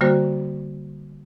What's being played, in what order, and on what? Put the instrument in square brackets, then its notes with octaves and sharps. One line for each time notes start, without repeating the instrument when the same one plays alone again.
[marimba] D3 G3 A#3 F#4 C5